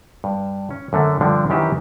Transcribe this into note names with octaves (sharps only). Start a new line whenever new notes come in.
G2
C#4
F#2 D3 A3
G2 D3 F3 D4
F#2 D#3 E3 G4 D#5 A5